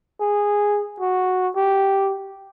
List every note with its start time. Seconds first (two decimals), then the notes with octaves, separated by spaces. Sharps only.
0.20 G#4
1.00 F#4
1.56 G4